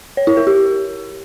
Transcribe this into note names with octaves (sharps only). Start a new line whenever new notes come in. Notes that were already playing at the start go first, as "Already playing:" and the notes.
C#5
E4
A#4
G4